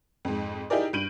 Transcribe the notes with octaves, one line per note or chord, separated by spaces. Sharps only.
F2 G#2
D#4 E4 G4 G#4 A#4 D5
G2 G6 D7 D#7 F#7